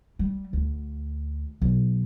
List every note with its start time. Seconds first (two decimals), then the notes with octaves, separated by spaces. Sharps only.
0.19 G3
0.53 D2
1.62 B1